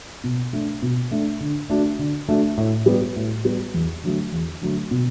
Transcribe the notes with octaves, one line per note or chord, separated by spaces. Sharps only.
B2
A3 D4
B2
A3 D4
D3
A3 D4 F#4
D3
A3 D4 F#4
A2
G3 B3 F#4
A2
G3 B3 F#4
E2
D3 F#3 A3
E2
D3 F#3 A3
B2